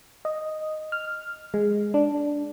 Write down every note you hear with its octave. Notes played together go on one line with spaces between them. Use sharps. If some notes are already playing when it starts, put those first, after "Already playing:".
D#5
F6
G#3
D4